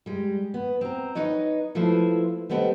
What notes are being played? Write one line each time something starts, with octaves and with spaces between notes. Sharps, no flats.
G3 G#3
B3
C4 A#5
D#4 B4 C#5 D#5
F3 A3 E4 B4 C5
G3 A3 B3 C4 C#5 D#5